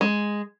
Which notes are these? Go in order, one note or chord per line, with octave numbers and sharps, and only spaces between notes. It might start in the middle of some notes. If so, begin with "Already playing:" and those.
G#3